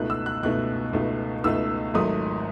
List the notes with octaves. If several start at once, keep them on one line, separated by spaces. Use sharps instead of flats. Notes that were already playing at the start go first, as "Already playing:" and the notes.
Already playing: C#2 B2 A3 D#4 F#6
E6
F#6
C#2 B2 A3 D#4 F#6
C#2 B2 A3 D#4
C#2 B2 A3 D#4 E6
G#1 G#2 F#3 A3 D#6